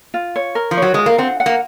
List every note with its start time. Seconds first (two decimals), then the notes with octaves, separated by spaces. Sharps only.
0.14 F4
0.36 C#5
0.55 A#4
0.71 F3
0.77 F#3 C#5
0.94 G#3 F4
1.06 A#3
1.18 C4 F#5
1.40 F#5
1.46 A#3